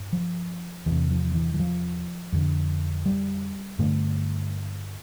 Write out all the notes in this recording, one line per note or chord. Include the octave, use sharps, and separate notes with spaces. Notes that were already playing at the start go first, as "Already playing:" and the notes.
Already playing: G2
F3
E2 C3 E3
F3
E3
E3
F3
F2 D3
G3
G2 D3 A3